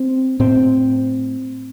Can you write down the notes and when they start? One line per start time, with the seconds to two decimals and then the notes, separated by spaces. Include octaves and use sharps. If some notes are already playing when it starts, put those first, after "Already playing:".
Already playing: C4
0.40 A2 C4